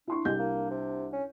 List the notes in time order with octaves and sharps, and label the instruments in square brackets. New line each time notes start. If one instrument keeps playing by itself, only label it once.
[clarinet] D4 [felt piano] E4 C6 C#6
[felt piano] C2 G4 G6 [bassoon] G#3
[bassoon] A#3
C3
C#4